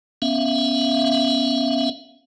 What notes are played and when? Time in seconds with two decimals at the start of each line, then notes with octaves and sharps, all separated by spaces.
0.22 B3 C#4 E5 F5